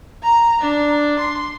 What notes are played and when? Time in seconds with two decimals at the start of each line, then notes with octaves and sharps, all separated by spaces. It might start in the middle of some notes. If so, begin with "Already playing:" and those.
0.23 A#5
0.61 D4
1.19 C6